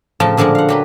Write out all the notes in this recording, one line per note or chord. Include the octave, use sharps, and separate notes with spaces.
A2 C#3 F3 G5 A5 A#5
A#2 D3 F3 G#3 D4
F5 F#5
F#3 G4 B4